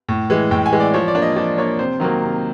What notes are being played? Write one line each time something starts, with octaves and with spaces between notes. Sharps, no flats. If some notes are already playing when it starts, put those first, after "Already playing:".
A2
E3 G#3
A2 G5
G#5
E3 G#3
D5
F3 C#5
D5
A#3 D4
D#5
F3 D5
A#3 D4 C#5
C3 C5
D#3 F#3 A#3
C3